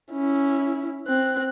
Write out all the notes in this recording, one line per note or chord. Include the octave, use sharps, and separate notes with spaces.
C#4 E4
C4 F#6